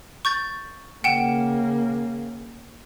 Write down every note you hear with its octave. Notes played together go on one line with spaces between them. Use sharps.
C#6 G6 A6
C#3 A#3 F#5 G5 E7